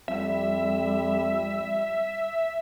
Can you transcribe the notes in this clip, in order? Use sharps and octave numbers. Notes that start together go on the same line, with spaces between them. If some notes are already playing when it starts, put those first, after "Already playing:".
F2 G3 E5